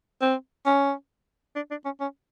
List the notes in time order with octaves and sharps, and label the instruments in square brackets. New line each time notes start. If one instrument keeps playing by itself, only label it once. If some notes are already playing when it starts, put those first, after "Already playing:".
[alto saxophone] C4
C#4
D4
D4
C#4
C#4